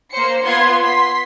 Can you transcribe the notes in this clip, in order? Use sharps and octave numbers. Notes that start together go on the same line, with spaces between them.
A#3 C5 C#7
B3 F4 C6 G#6
C6 B6